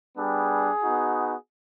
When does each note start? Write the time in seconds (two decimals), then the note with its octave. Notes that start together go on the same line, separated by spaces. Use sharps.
0.16 G3 B3 D4 G4 G#4
0.82 B3 D#4 F#4